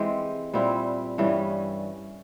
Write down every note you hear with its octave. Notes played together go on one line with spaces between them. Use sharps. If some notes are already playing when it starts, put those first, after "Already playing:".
Already playing: E3 G#3 C4 G4
A#2 G3 C4 E4
G2 E3 G3 C#4